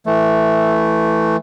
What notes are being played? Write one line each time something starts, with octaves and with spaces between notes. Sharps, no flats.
E3 A3